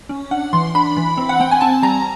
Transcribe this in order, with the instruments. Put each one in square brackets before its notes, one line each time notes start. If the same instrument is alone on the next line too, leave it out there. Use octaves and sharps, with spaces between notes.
[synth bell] C#4
D4 F#5
E3 C6
D4 B5
E3
C4
F#5
C4 G5
G#5
C4 A5
G3 A#5